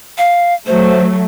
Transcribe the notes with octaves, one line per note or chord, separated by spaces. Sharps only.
F5
F#3 A3 C5